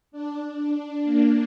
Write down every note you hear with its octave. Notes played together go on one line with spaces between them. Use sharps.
D4
D4
D4
A#3